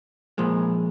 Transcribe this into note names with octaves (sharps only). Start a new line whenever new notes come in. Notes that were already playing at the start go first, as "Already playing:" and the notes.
A#2 F3 G#3